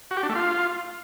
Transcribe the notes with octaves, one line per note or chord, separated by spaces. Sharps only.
F#4
G4
D4
A3
F4